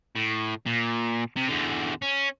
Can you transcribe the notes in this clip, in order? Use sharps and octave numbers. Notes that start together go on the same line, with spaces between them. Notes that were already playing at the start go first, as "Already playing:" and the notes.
A2
A#2
C3
E2 D3
C#4